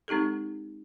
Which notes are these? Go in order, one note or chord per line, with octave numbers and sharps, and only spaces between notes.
G#3 C4 D#4 G4 A4